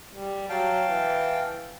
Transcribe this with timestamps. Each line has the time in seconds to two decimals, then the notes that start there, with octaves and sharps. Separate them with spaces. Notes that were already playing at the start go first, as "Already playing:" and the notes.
0.15 G3
0.49 F#3 F5 G5 A5
0.88 E3